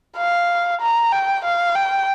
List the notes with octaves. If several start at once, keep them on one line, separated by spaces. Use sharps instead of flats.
F5
A#5
G5
F5
G5